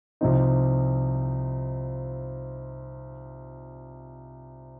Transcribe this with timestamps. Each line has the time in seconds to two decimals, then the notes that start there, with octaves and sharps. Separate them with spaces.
0.21 C2 C3 F3 C4 D#4